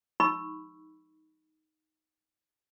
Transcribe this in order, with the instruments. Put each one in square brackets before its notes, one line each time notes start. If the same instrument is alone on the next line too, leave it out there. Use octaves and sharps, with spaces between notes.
[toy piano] D#4 B5 C#6 E6